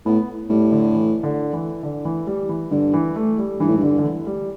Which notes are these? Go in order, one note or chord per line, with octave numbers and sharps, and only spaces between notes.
A2 B3
A2 G3
D3
E3
D3
E3
D3
E3
G3
E3
G2 D3
E3
A3
G3
G2 E3
A2
G2
D3
D3
E3
G3